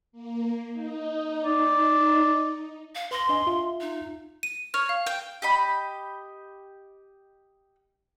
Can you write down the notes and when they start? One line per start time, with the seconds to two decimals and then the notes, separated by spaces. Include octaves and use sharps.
0.12 A#3
0.72 D#4
1.45 D5
2.95 F5
3.11 B4 C6 A#6
3.29 D4 D#5 G#5
3.47 F4 E5
3.81 D#4
4.43 D#7
4.74 C#5 F6
4.89 F5
5.07 G5
5.42 G4 D#5 B5